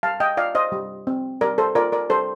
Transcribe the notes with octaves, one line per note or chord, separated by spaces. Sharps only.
G3 F5 A5
D#5 G5
F4 D5 F5
C5 D#5
G3
C4
G3 A#4 D5
A4 C5
F4 A#4 D5
A#4 D5
G3 A4 C5